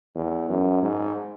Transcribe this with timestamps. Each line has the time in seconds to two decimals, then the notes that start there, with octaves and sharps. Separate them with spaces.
0.16 E2
0.49 F#2
0.83 G#2